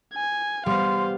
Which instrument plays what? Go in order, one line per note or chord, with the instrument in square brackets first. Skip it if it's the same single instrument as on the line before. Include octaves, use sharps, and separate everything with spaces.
[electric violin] G#5
[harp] G3 B3 [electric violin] C5 F5 [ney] C6